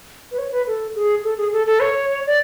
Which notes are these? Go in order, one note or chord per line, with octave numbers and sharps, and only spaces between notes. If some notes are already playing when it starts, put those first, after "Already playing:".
B4
C#5
B4
A4
G#4
A4
G#4
A4
A4
C#5
D5